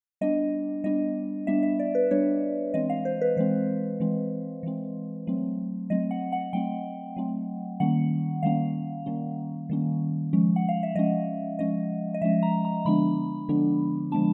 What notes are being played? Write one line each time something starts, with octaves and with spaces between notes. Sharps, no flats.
G3 B3 D4 D#5
G3 B3 D4 D#5
G3 B3 D4 E5
E5
D5
B4
G3 B3 D4 C#5
E3 G#3 C4 D#5
F5
C5
B4
E3 G#3 C4 C5
E3 G#3 C4
E3 G#3 C4
F#3 A3 C4
F#3 A3 C4 D#5
F#5
F#5
F#3 A3 C4 G5
F#3 A3 C4
D#3 G3 A#3 C#4 F#5
D#3 G3 A#3 C#4 F5
D#3 G3 A#3 C#4
D#3 G3 A#3 C#4
F3 G#3 C#4
F#5
F5
E5
F3 G#3 C#4 D#5
F3 G#3 C#4 D#5
D#5
F3 G#3 C#4 E5
A#5
A#5
D3 F3 G#3 B3 D4 B5
D3 F3 G#3 B3 D4
D3 F3 G#3 B3 D4 A5